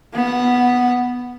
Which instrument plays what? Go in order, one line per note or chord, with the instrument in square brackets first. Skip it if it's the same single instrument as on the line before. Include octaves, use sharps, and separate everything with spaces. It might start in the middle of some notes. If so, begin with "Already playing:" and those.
[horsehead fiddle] B3 F#5